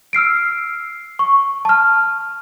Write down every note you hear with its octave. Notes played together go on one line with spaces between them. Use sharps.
E6 F6 C7 D7
C#6
A5 F6